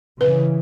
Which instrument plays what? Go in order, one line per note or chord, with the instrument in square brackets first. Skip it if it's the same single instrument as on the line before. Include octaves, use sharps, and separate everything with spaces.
[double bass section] C#3 E3 [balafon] B4